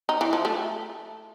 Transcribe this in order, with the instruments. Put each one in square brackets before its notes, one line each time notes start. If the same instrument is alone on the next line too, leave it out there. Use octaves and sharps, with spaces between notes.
[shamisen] D#4
E3
F3
A3